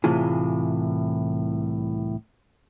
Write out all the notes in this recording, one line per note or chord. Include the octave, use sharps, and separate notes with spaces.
C2 A2 C3 E3 F4 G#4